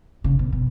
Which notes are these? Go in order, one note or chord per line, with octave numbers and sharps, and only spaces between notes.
C#3
B2
B2